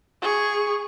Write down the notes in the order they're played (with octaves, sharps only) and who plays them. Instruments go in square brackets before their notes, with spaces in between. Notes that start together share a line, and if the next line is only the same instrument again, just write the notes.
[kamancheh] G#4 C#6